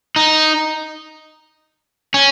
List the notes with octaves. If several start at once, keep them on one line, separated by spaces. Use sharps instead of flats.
D#4
C#4